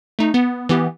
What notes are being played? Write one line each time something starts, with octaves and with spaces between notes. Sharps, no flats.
A3 D#4
B3
E3 B3 G4